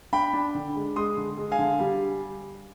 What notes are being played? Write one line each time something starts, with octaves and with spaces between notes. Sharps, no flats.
D4 G5 B5
D4
D3
G#3
G#3 C6 D#6
D3
G#3
F5 G#5
D3
G3